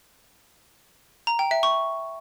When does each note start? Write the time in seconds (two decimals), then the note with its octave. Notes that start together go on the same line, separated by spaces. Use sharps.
1.27 A#5
1.39 G5
1.51 E5
1.63 C#6